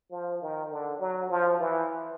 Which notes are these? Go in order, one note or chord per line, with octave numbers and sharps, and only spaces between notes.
F3
D#3
D3
F#3
F3
E3